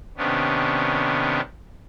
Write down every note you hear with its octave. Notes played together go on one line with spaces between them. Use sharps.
C3 D#3 B3 C#4 D4